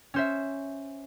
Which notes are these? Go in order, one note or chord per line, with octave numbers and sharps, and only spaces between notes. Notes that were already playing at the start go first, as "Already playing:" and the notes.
C#4 C5 E5